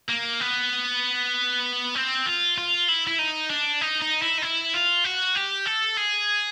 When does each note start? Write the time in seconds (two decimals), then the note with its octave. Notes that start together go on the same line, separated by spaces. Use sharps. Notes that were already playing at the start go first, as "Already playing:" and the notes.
0.09 A#3
0.41 B3
1.96 C4
2.26 F4
2.58 F4
2.88 E4
3.07 E4
3.19 D#4
3.50 D4
3.81 D#4
4.02 D#4
4.22 E4
4.39 D#4
4.43 E4
4.74 F4
5.05 F#4
5.36 G4
5.66 A4
5.97 G#4